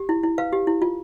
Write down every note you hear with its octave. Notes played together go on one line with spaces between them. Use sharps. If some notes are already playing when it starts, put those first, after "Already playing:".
Already playing: G4
E4
E4
B4 F5
G4
E4
F4